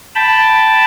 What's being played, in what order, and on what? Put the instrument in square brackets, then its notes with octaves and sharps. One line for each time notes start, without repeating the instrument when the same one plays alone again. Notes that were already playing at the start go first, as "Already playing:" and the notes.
[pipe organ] G5 A5 B5